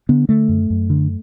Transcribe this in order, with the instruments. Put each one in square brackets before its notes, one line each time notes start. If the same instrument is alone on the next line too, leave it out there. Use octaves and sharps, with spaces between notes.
[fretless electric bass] D3 B3
D3 A3
F#2
F#2
D3